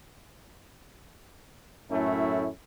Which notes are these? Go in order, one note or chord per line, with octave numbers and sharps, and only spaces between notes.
F#2 A2 A3 C#4 E4